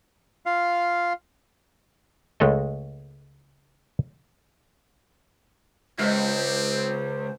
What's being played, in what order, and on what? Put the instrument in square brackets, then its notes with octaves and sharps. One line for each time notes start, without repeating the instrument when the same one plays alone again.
[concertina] F4 F5
[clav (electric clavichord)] C#2 G#3 A3 A4 D#5
[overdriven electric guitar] C#2 [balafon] G#3 D#5 [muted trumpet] C4 [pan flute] C5